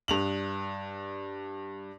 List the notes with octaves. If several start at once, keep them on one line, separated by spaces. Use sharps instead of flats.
G2 F7 F#7